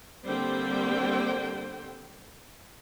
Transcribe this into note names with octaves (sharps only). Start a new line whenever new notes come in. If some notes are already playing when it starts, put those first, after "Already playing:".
D3 G3 A#3 C4 C5 G5